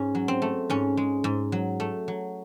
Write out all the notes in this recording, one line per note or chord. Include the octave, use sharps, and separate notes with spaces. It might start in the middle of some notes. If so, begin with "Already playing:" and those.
Already playing: G#2 C#4
F#3
C4
A3
G#2 C#4
G#3
G#2
F#3
A3
F#3